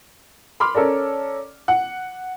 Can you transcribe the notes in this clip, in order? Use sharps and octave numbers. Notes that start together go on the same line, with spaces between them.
B5 C6 D6 F6
C#4 A4 A#4 D5
F#5